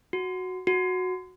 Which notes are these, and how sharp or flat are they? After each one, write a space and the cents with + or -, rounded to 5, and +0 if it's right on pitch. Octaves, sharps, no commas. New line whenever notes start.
F#4 -5
F#4 -10